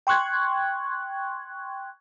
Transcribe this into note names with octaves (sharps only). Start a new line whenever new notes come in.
G5 C6 C#6 F#6 G#6